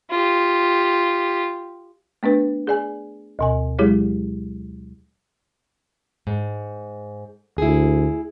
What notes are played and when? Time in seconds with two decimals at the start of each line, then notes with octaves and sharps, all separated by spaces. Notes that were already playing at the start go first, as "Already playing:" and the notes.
0.11 F4 G4
2.23 A3 B3 D4 B4
2.67 G#4 D5 G#5
3.39 D2 B2 G#5
3.79 F#3 G#3 E4 G4 G#4 C#5
6.27 G#2
7.58 D2 E4 G#4